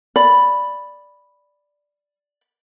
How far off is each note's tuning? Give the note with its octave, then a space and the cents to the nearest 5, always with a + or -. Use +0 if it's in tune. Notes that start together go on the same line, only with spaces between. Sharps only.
D5 +0 B5 +0